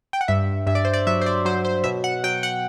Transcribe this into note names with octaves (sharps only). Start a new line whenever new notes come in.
G5
F#5
G2 E5
G2 E5
D5
C5
D5
F#3 E5
C5
D5
F#3 C5
C5
B2 E5
F#5
F#3 G5
F#5